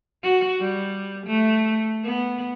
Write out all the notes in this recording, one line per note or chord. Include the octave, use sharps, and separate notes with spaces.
F#4
G3
A3
B3